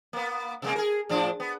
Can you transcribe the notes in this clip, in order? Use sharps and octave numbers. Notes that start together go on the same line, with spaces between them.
A#3 B3
C3 G#3 A#3
G#4 A#4
A2 F3 D4
B3